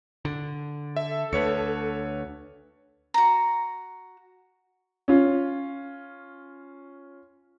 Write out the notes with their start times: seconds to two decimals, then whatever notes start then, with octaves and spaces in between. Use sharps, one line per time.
0.25 D3
0.96 A4 E5
1.33 D2 B4 C#5 C#7
3.14 F#4 A#5
5.08 C#4 F4